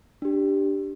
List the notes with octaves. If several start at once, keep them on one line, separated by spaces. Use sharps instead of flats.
D4 G4